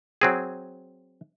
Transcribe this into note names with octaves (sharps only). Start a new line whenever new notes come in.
F#3 C4 G#4